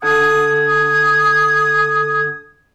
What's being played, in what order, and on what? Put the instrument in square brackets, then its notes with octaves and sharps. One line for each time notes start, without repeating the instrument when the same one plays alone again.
[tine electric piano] D3 A4 F#5 [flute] D#6 [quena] G#6
[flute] D#6